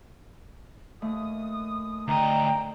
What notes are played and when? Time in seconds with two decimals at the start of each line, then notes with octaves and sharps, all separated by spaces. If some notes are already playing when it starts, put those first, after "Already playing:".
1.02 D#2 A3 D#6
2.08 D2 D3 D#3 D#5 G5 A#5